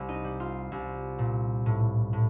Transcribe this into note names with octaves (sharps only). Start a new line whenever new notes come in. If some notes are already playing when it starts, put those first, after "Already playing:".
Already playing: C2
D#4
G3
F4
C2
A#2
A2
A2